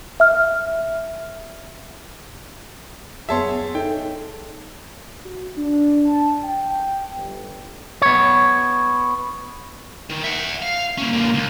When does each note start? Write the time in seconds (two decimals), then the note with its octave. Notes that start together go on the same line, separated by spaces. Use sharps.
0.20 E5 F6
3.29 F#2 B3 G#4 C#5 E5 F#5 A5 C6
3.75 D#4 A4 G5
5.25 F#4
5.57 D4
6.06 A5
6.44 G5
7.16 G1
8.02 B3 C#5
10.10 D#3
10.24 E5 F#5
10.62 F5
10.98 A#3 C#4
11.13 D3 A#3
11.34 C#2